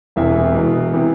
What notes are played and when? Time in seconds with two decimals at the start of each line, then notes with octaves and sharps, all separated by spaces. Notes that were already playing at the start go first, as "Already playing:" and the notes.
0.16 E1 E2 C3 E3 E5
0.54 E2 B2
0.93 C3 E3